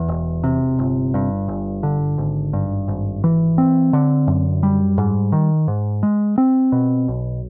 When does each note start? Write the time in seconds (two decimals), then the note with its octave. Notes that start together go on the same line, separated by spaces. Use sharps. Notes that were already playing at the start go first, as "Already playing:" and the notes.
Already playing: E2
0.08 E1
0.44 C3
0.79 G1
1.14 G2
1.48 G1
1.83 D3
2.18 G#1
2.53 G2
2.88 G#1
3.24 E3
3.58 C4
3.93 D3
4.28 F#2
4.63 G3
4.98 G#2
5.32 D#3
5.68 G#2
6.03 G#3
6.38 C4
6.72 B2
7.08 B1